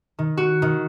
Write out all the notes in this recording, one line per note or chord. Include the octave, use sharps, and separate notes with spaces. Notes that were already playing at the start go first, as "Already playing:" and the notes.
D#3
F#4
D#3